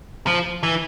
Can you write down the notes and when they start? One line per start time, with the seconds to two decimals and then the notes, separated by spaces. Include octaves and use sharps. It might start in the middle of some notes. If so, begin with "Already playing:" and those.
0.27 F3
0.63 E3